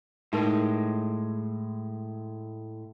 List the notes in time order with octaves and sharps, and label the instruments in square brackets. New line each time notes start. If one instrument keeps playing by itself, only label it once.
[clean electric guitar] A2 G#3 [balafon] D#4 A#4